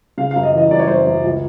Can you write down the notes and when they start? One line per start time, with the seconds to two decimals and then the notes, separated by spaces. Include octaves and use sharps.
0.18 C#3 F5
0.31 F5
0.36 F#2
0.43 D#5
0.52 E3
0.58 D#5
0.71 F#2 D5
0.79 C#5
0.87 F#2 C5
0.94 C#5
1.06 F#2
1.24 C#2